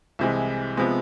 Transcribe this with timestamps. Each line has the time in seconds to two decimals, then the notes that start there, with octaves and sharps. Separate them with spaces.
0.19 C2 C3 E3 G#3
0.77 C3 F3 G#3 B3